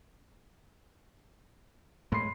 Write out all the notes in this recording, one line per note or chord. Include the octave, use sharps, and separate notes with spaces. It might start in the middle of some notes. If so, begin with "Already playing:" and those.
A2 G#3 B5 C6 C7